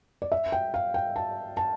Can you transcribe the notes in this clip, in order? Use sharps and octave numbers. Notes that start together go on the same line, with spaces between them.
D5
E5
G5
F5
G5
A5
A5